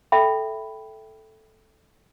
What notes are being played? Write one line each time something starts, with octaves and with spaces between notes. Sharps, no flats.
A4 E5 G5 B5